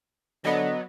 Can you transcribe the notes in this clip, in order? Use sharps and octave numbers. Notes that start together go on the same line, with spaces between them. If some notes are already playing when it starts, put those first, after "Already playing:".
D3 F#3 B3 D#5